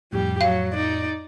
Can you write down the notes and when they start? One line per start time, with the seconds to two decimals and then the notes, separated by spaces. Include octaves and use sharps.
0.12 F2 A2 G3 G4
0.41 F#3 F5
0.74 D#4 D5